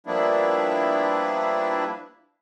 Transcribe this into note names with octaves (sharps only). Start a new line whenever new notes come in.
F3 G3 A#3 B3 D4 E4